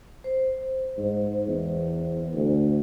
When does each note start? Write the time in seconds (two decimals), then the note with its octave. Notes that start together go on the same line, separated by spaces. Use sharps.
0.24 C5
0.98 G#2
1.48 E2
2.34 D2